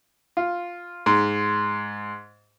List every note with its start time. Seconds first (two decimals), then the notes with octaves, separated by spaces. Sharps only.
0.37 F4
1.06 G#2